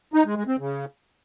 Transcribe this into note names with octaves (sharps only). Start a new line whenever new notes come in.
D#4
G#3
G#3
C4
C#3